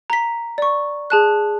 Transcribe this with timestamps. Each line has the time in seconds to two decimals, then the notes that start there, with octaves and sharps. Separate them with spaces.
0.10 A#5 B6
0.58 D5 C#6
1.10 G#4 A5 F#6